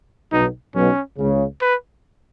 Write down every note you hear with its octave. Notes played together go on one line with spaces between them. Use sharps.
B1 B2 D#4
B1 B2 C#4
C#2 C#3
B4